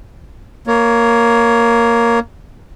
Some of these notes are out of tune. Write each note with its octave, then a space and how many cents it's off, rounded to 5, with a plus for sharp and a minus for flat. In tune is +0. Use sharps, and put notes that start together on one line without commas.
A#3 +0 C#5 +10